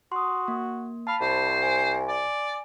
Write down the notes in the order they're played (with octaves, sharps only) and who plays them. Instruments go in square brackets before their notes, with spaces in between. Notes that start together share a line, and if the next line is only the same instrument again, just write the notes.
[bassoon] F#4 [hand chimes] C6 D#6
[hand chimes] A#3
[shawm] F5 [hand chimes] A5 B5
[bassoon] C2 [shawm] C5
[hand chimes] G#5
[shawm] D5